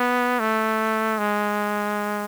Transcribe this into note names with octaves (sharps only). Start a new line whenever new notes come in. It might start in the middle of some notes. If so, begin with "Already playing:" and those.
Already playing: B3
A3
G#3